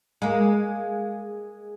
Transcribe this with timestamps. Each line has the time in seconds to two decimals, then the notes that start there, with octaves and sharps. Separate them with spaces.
0.22 G#3 A#3